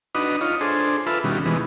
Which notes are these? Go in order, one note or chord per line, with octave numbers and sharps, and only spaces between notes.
D4 D#4 F#4 B4 D#5
F4 C#5 D#5
D4 G#4 A4 C5
F4 A4 B4 E5
B2 D#3 G3 C#4 F#4
B2 D#3 E3 G#3 B3